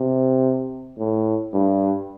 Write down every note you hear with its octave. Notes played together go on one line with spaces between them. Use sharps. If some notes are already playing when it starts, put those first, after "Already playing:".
Already playing: C3
A2
G2